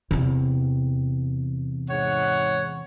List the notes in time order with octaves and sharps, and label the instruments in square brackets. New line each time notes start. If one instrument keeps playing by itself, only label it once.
[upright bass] E2 C3
[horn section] G#2 C#5 F#5